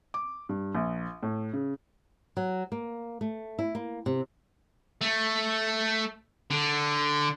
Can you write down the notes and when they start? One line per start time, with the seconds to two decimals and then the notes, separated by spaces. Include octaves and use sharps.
0.14 D6
0.49 G2
0.75 A#1
1.23 A2
1.53 C#3
2.37 F#3
2.72 A#3
3.21 A3
3.59 E4
3.75 A#3
4.06 C3
5.01 A3
6.51 D3